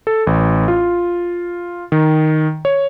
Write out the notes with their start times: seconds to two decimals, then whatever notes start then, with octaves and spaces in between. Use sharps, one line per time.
0.07 A4
0.27 A1
0.68 F4
1.92 D#3
2.65 C#5